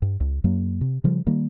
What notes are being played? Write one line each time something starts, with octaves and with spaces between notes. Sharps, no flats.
G2
C#2
F#2 F#3 A#3
C3
C#3 F3 G3
D#3 G3 A#3